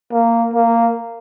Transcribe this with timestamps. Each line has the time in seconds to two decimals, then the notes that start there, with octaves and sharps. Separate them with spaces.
0.12 A#3
0.53 A#3